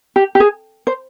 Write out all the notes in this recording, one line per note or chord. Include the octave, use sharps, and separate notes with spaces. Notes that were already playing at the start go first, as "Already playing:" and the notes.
G4
G4
G#4
C5